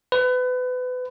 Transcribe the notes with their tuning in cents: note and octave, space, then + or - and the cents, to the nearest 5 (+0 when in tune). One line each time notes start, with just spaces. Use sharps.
B4 +30